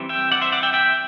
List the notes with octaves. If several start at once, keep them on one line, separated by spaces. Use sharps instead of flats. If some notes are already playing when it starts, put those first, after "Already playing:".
Already playing: E3 G3 C4
E5 G5
D5 F#5
C5 E5
D5 F#5
E5 G5
E5 G5